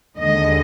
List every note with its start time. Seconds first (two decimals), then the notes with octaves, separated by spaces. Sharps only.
0.16 D#2 D3 G#3 D#5